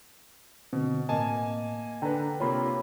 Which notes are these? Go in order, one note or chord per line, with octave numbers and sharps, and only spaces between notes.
B2 D3 C4
A2 A#3 D#5 G#5 A5
D3 D4 B4 G5 A#5
C3 A#3 F4 C#5 B5